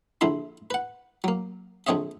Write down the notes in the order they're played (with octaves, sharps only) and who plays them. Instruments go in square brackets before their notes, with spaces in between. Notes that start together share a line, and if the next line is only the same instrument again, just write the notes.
[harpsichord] A#1 D3 E4 E5 C6
B4 F#5
F#3 A#3
A#1 D3 C4 C#5 D#5 E5